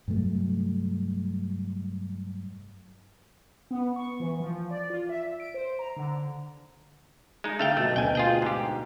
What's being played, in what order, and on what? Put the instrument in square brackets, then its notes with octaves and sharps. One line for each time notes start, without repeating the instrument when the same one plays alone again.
[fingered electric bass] G2 C3 F#3 A3
[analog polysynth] B3
C#6
E3
F3
D5
F4
E5
D7
C5
A#5
D3
[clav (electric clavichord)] G#3 D#4
[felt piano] D3 [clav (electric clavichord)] A3 F5 G5
[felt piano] B2 F#3 [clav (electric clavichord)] A3
[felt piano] D2 B2 [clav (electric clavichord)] G5 G#5
[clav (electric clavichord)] F4 G#4 G5
G#2 G4